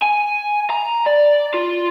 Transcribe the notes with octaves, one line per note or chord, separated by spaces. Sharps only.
G#5
A#5
D5
F4